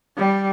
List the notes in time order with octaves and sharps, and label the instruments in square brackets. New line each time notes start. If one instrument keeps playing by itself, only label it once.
[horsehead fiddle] G3